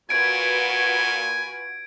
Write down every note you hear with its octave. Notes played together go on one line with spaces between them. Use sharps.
A#2 F4 F#4 B4 G#5 G#6 D7